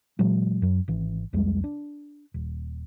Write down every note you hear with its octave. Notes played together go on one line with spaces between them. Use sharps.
A#2 E3 F#3 G#3
F#2 F#3
G#1 E3
C2 F2 G3 G#3
D4
D#1